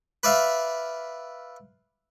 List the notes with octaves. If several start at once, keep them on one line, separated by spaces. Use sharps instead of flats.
B4 D5 E5 F5